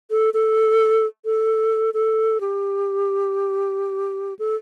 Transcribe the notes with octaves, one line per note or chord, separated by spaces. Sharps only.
A4
A4
A4
A4
G4
A4